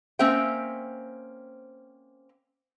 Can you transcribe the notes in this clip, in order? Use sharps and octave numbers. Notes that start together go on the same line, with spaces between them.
A#3 C4 C#4 C5 E5 G5